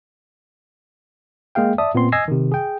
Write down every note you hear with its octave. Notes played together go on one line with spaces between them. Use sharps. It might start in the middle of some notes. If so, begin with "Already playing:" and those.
G#3 A#3 G#4 F5 G5
D5 E5 A5 D#6
A#2 B3 C4 C6
D#5 G#5 E6 G#6 A#6 C7
C3 D#3
G#4 G5